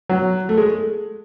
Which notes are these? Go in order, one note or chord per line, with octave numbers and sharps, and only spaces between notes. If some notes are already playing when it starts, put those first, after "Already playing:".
F#3
A3
G#3